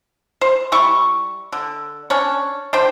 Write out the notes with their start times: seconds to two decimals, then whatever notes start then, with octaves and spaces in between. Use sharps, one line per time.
0.41 C5
0.72 G3 E4 C#6
1.52 D3
2.10 C#4 D4 C#5
2.73 D4 C5 G5